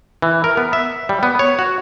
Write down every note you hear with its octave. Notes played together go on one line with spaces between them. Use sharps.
E3
A#4
B3
E5
G3
B3
C#5
F#4